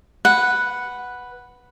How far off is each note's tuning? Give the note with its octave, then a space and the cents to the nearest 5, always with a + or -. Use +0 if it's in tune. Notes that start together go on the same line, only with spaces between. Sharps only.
B4 +0 F#5 +0